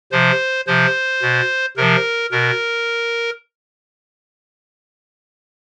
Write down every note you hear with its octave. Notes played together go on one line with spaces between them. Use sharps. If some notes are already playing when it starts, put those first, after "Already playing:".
C3 F3 C5
C3 F3 C5
B2
C3 F3 A#4
B2 A#4